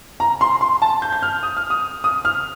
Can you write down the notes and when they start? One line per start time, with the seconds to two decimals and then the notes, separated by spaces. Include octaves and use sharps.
0.20 A#5
0.41 C6
0.61 C6
0.82 A5
1.02 G6
1.12 G6
1.22 F6
1.43 D#6
1.57 F6
1.70 D#6
2.04 D#6
2.25 F6